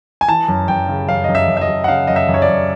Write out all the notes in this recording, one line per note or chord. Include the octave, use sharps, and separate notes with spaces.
G#5
E3 A5
F#2
F#2 G5
C#3
F#2 F5
F#2 D#5
E5
F#2
E5
D#5
F#2
F#5
C#3 F5
F#2 D#5
E5
F#2
C#5
D5
F#2